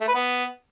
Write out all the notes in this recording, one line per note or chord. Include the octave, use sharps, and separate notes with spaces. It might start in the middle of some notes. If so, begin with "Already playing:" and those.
A3
B4
B3